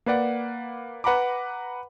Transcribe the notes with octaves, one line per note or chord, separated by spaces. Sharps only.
A#3 B4 D5 F#5
B4 F#5 A#5 B5 D6